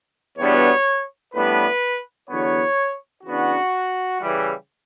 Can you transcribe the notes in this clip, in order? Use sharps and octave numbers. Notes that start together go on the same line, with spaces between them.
E2 B2 G3 B3 D4 C#5
A2 G3 B3 D4 B4
E2 D3 F#3 B3 C#5
C#3 E3 B3 D4 F#4
C#3 E3 G3